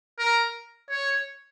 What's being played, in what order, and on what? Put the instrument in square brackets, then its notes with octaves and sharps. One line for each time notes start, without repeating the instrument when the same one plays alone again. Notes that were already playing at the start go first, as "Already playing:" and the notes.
[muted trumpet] A#4
C#5